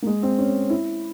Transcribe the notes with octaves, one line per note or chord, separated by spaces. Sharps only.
A#3
G#3
C4
C#4
E4